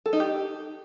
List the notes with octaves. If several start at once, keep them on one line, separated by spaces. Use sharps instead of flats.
A4
D#4
G4